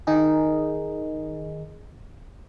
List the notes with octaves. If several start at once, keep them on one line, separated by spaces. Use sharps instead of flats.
D#3 D#4 G#4